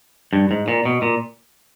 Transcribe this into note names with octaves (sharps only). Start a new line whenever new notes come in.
G2
G#2
A#2
B2
A#2